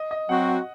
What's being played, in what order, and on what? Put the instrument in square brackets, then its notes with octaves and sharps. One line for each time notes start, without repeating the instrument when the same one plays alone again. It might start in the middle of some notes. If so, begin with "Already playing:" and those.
Already playing: [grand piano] D#5
D#5
[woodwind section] F#3 C4 F#4 [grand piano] F#5
[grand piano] F#5